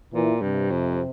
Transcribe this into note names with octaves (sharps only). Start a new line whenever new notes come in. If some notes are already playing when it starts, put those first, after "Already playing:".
A#2 E3
G2 C3
F2